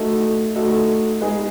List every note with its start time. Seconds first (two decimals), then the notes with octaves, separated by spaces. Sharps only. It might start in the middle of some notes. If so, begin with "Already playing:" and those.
Already playing: A3 D#4 F#4 A4
0.55 A3 D#4 F#4 A4
1.21 G#3 B3 D#4 G#4 B4